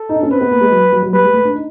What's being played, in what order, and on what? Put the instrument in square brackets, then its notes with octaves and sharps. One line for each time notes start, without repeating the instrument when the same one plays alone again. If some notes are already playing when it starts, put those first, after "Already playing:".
Already playing: [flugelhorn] A4
[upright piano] D#4
D4
C#4
[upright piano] C4 [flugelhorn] B4
[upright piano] B3
A#3
G#3
F#3
F#3
F#3
[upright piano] G3 [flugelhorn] B4
[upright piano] G#3
A3
D4
D#4